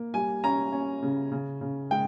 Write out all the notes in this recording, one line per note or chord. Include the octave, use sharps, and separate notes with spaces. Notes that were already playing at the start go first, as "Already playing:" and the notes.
Already playing: A#3
G3 G#5
C#4 A#5
C#4
C#3
C#3
C#3
G#3 G5